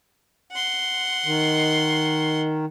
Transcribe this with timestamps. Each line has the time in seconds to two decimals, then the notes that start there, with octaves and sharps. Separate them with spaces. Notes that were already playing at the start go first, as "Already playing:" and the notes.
0.51 F#5 C6
1.25 D#3